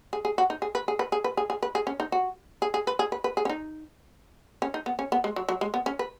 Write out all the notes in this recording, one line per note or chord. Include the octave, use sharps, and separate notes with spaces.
G#4
G#4
F#4
D#4
G#4
B4
G#4
B4
G#4
B4
G#4
G#4
B4
G#4
C#4
D#4
F#4
G#4
G#4
B4
G#4
B4
B4
G#4
C#4
D#4
C#4
D#4
B3
C#4
B3
G#3
F#3
F#3
G#3
B3
C#4
B4